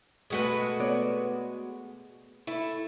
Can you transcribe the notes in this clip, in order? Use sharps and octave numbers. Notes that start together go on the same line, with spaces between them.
B2 G#3 A3 F#4 B4
B3 C#5 D5
A3 E4